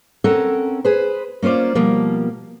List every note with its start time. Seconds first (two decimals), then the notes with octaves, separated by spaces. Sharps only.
0.24 C4 C#4 A4 A#4 F#5
0.85 G#4 B4 C5
1.42 A#3 C#4 F4 C5 D5
1.75 B2 F3 G3 A#3